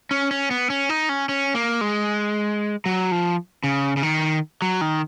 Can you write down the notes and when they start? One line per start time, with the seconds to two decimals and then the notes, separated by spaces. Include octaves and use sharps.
0.11 C#4
0.31 C#4
0.51 B3
0.70 C#4
0.89 D#4
1.09 C#4
1.29 C#4
1.55 A#3
1.81 G#3
2.86 F#3
3.12 F3
3.64 C#3
3.97 C#3
4.03 D#3
4.62 F#3
4.81 D#3